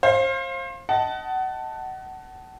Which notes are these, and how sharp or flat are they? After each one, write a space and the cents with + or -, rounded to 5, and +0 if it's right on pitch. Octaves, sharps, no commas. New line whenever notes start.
C5 +30 F5 +0
D#5 +15 F#5 +25 A5 +0